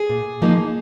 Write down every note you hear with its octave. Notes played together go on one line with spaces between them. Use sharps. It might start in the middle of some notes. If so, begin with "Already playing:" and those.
Already playing: G#4
A#2
F3 A#3 D#4